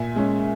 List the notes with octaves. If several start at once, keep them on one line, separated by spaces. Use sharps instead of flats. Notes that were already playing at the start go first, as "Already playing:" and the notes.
Already playing: A#2 E5 G#5
G#3 C#4